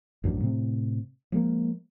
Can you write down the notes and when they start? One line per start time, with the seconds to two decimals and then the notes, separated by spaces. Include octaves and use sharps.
0.24 A1 F#2 F#3 D4
0.41 A2 C3
1.32 F3 G#3 A#3